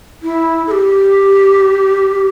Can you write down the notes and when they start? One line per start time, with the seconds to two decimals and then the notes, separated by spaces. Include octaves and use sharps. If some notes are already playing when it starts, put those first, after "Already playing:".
0.23 E4
0.67 A4
0.71 G4